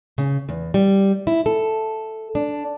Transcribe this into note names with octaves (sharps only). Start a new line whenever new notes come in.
C#3
E2
G3
E4
A4
D4